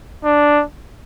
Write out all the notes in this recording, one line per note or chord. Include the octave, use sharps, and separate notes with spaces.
D4